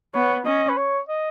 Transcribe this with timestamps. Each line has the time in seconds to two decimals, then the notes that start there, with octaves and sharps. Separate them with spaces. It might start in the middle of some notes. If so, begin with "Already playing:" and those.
0.14 B3 C#5
0.46 C#4 D#5
0.69 B4
0.77 C#5
1.09 D#5